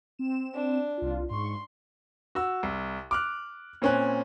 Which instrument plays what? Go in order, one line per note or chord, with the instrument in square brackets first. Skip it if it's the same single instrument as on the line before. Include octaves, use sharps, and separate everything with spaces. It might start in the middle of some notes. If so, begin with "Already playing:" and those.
[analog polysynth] C4 E7
[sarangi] D4
[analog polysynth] C2 F4
[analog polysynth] G#2 C#6 [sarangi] C6
[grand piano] F#4 E6
C2
D6 F6 F#6
A#2 C4 C#4 G#5 F#6